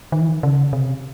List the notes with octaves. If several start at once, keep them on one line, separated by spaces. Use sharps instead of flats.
D#3
E3
D#3
C#3
C3